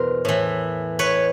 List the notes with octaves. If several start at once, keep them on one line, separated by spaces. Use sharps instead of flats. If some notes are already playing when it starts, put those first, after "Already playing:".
Already playing: E2 B2 A#4 C5
A2 E3
B4 C#5